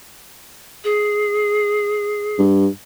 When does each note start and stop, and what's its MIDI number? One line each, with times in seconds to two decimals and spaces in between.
0.84 2.41 68
2.39 2.67 43